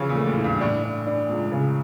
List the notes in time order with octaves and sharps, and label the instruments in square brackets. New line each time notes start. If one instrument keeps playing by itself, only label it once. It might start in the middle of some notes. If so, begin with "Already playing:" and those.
Already playing: [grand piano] C#3 E3 F3
A#2
[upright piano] A3
[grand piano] A2
[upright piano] E4
[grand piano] G2
[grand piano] A2 [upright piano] D4
[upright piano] D4
D4
C#2
C#3